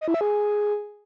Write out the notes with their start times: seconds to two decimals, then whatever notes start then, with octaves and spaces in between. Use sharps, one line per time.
0.01 D#5
0.08 E4
0.14 E5
0.21 G#4